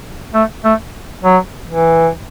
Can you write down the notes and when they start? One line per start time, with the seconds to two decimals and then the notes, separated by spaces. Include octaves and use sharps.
0.34 A3
0.65 A3
1.24 F#3
1.68 E3